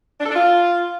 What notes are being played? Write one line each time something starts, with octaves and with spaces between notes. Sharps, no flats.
D4
A4
D4
F4